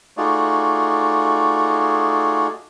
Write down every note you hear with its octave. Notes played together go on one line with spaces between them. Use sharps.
A3 D#4 F4 F#4 G#4 D5